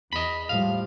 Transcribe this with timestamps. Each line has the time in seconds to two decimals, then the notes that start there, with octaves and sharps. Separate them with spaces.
0.13 E2 D#5 B5
0.49 A2 F3 G3 F5